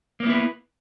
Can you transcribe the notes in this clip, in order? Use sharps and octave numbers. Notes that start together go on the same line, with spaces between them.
A#3 B3 E4 B4